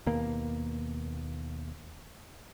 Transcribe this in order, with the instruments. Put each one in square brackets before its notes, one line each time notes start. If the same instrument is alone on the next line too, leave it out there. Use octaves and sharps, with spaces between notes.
[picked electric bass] D#2 B2 A#3